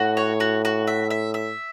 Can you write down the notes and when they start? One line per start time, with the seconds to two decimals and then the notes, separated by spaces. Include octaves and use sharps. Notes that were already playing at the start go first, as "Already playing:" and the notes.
Already playing: A2 F#4
0.17 C#5
0.40 F#4
0.65 F#4
0.87 E5
1.10 E5
1.34 E5